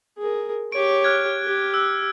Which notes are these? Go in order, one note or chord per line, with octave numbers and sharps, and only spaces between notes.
G#4 A#4
G4 C#5 D7
F6 F#6 G#6
G4
E6 F#6